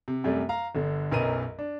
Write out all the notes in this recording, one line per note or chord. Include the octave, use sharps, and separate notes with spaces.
C3
F#2 C3 G3 A3
F5 A#5
G1 D3
B1 F#2 A#4 B4 D#5 D#7
D4